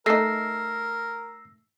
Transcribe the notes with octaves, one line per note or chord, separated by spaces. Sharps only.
A3 D#4 A#4 E6 A#6 C7